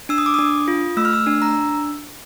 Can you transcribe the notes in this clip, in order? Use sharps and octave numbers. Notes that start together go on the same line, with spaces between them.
D4 E6
D#6
D6
D4 D#6
F4
A3 E6
F6
E6
D4
A#5